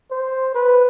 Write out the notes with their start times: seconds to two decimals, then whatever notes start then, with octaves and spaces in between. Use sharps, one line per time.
0.11 C5
0.55 B4